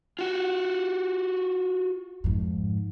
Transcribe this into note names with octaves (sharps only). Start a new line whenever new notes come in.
F4 F#4
F2 G#2